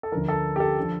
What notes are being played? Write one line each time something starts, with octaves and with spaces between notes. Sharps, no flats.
A4
D2 D3 F3 A#4
A4
G4
A4
D3 F3